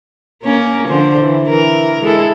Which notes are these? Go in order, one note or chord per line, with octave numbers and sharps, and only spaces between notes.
A#3 C#4 A#4
D3 F3 C5
E3
E3 A#4
G#3 E4 A4